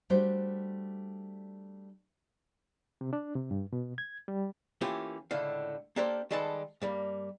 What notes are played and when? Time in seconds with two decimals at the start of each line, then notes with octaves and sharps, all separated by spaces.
0.10 G3 A3 D4 F#4 C5
3.01 C3
3.13 D4
3.35 C3
3.51 G2
3.73 B2
3.98 G#6
4.28 G3
4.81 E3 A3 A#3 C#4 F4 G4
5.31 C#2 A2 D3 F5
5.96 A#3 D4 G4 A4 A#4 C5
6.31 D#3 G3 G#3 A4 B4 A5
6.82 G2 G3 A#3